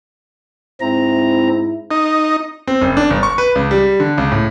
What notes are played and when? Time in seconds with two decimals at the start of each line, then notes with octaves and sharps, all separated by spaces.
0.81 G#2 C4 E4 A#5
1.91 D#4
2.68 C4
2.82 F#1
2.97 D4
3.10 G1
3.23 C#6
3.38 B4
3.55 C#2
3.71 G3
4.00 D3
4.18 C#2
4.31 A2